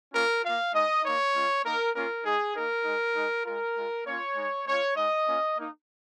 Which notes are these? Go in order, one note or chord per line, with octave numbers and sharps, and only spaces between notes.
A#3 C#4 F4 A#4
A#3 F4 F5
G#3 D#4 D#5
A#3 D#4 C#5
G#3 C#4 F4
A#3 D#4 A#4
A#3 C#4 F4 A#4
G#3 D#4 G#4
A#3 D#4 A#4
G#3 D#4
G#3 D#4
G#3 F4 A#4
G#3 F4
A#3 C#4 F4 C#5
G#3 D#4
G#3 C#4 F4 C#5
G#3 D#4 D#5
A#3 C#4 F4
A#3 D#4